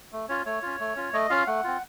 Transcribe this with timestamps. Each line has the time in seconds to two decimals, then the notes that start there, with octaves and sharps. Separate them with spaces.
0.12 A3
0.29 C#4 F4 C#5
0.46 A3 C#5
0.63 C#4 F4
0.80 A3
0.96 C#4 F4
1.13 A3 D#5
1.30 C#4 F4 F5
1.47 A3 F#5
1.64 C4 F4